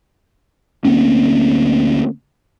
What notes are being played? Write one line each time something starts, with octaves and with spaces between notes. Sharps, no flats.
D2 A#3 C4 C#4